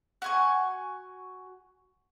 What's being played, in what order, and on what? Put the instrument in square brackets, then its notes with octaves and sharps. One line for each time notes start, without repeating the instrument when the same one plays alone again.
[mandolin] F#4 G#5 C#6